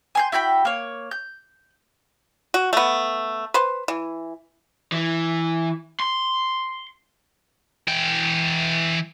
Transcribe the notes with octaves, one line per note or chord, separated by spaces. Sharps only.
G#5 C6 G6
E4 F#4 G5 B5
A#3 C#5
G6
F#4
A3 B3
B4 C5
E3
E3
C6
E3 G5